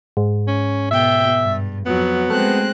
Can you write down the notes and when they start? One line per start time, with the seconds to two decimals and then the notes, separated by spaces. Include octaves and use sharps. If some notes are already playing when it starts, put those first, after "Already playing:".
0.17 G#2
0.47 C#4
0.91 B2 E5 G5
1.40 G2
1.86 F2 F#3 B3
2.30 G#3 A3 C4 F#6